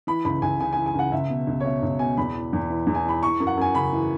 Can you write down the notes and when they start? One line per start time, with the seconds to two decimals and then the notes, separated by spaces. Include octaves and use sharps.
0.07 E3 B5
0.25 C#2 B5
0.42 C#2 G#5
0.60 C#3 G#5
0.73 E3 G#5
0.86 G#5
0.94 C#2 F#5
1.12 C#2 E5
1.30 B2
1.47 C#2
1.60 C#5
1.65 B2 E5
1.83 C#2
1.99 B2 G#5
2.17 E2 B5
2.34 E3
2.53 E2
2.70 E3
2.87 E2
2.95 G#5
3.05 E3 B5
3.23 E3 C#6
3.40 F#2
3.47 F#5
3.57 F#2 G#5
3.74 C#3 B5
3.93 E3